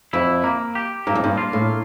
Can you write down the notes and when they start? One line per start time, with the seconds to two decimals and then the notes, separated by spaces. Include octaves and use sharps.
0.13 F2 E4
0.44 A#3
0.75 G4
1.07 G2 A#3
1.15 F2
1.24 G2
1.38 F4
1.53 A2